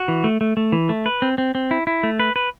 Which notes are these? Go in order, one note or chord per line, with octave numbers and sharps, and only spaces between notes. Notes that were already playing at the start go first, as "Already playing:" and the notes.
Already playing: F#4
E3
A3
A3
A3
E3
A3
B4
C4
C4
C4
E4
E4
A3
B4
B4